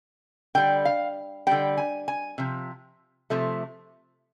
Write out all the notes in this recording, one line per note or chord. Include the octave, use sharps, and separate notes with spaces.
D3 G3 G5
F5
D3 G3 G5
G#5
G#5
C3 F3
C3 F3 A3